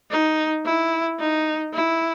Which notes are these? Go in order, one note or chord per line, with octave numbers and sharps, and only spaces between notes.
D#4
E4
D#4
E4